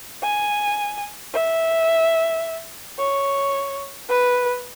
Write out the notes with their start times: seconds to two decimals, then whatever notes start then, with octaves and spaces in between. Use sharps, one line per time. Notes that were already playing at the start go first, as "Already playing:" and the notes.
0.23 G#5
1.34 E5
2.99 C#5
4.09 B4